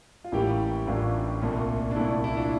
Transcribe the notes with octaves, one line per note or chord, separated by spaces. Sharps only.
F4
A1 A2 G3 A#3 E4 G4
A1 A2 G3 A#3 D4 F4
C2 A#2 A3
D4
C2 A#2 A3 E4
D4
E4
D4 F4